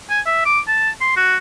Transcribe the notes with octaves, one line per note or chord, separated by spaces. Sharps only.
G#5
E5
D6
A5
C6
F#4